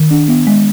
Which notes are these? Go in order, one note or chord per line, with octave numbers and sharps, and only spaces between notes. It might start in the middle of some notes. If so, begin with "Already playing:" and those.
Already playing: D#3
D4
B3
G#3